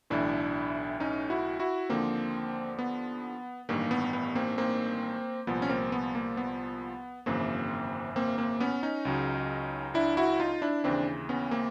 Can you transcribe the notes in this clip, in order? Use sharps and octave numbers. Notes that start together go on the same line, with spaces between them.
B1 A2 E3 D4 E4
C#4 D#4
E4 F#4
E4 F#4
D#2 D3 F3 A#3 C4
B3
A1 G2 D#3 A#3
B3
B3
A#3 C4
A#3 C4
C2 A#2 F3 B3
C#4
A#3 C4
B3
A#3
B3
G#1 F#2 C#3 E3 A#3 C4
A#3 C4
A#3 C4
B3 C#4
C#4 D#4
C#2 C#3 F#3
D4 E4
E4 F#4
D#4 F4
D4 E4
D#2 C#3 E3 C4 D4
B3 C#4
A#3 C4